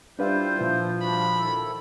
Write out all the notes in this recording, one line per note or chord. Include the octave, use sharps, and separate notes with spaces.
G3 D4 E4 F4 B4 C5 F5
A#2 F3
G3 D4 F#4 B5
D#3 E4 A4